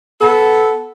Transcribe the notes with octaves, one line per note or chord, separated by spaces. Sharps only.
B3 A4